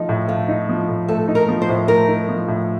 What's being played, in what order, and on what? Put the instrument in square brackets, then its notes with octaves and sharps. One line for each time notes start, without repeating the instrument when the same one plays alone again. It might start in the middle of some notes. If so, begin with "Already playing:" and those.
Already playing: [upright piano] F3 A3 D#4
A2
[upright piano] A3 [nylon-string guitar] F4
[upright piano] D#4
F3
A2
[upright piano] A3 [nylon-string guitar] A4
[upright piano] D#4
[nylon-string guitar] A#4
[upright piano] F3
[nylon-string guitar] C5
[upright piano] A2
[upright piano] A3 [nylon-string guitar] A#4
[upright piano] D#4
F3
A2